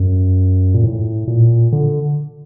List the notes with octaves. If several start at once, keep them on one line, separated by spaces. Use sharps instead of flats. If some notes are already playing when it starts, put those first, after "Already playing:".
Already playing: F#2
A#2
A2
A#2
D3